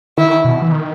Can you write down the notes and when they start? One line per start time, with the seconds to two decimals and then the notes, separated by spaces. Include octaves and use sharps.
0.18 D#3 E4
0.44 B2
0.62 E3
0.72 D#3